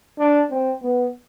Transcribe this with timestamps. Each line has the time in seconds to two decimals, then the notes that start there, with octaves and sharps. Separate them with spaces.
0.18 D4
0.50 C4
0.82 B3